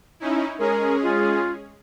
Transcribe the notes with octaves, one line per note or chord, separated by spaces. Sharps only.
C#4 D#4 E4
G#3 C#4 G#4 A#4
F4